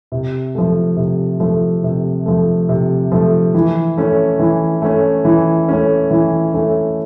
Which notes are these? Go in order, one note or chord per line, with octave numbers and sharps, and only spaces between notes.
C3
F3 A3
C3
F3 A3
C3
F3 A3
C3
F3 A3
E3
A3 C#4
E3
A3 C#4
E3
A3 C#4
E3
A3 C#4